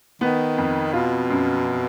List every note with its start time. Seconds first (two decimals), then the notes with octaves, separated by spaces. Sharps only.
0.21 D#3 B3
0.58 F2
0.93 B2 F4
1.30 F#2